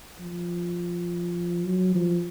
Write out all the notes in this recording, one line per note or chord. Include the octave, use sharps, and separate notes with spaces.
F3
F#3
F3